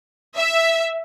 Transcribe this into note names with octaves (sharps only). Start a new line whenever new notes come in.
E5